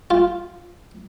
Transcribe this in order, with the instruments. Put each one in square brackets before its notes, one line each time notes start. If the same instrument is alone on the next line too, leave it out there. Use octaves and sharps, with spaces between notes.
[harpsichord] F4